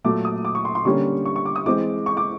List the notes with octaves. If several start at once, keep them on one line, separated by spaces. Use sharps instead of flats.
A#2 F#3 A3 D6
D#6
D6
C#6
C6
C6
D3 G3 A#3 C#4 C#6
C#6
C#6
D6
D#6
E3 G#3 C4 D6
C#6
D6